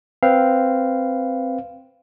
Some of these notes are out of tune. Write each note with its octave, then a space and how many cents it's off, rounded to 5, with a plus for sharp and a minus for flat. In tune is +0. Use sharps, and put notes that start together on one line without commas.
C4 +0 B4 +0 F5 -10